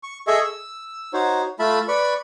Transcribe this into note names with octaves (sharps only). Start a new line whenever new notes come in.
C#6
G#4 A4 D#5 E5 C#6
E6
D#4 F#4 C5 C#5
A3 F4 E5 A5 B5
B4 D5 B5 C#6